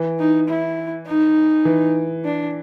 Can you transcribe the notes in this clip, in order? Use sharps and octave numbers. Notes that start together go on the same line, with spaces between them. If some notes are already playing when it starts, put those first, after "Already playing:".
Already playing: E3
D#4
E4
D#4
E3
D4